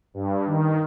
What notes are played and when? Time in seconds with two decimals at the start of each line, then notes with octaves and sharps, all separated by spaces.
0.14 G2
0.46 D#3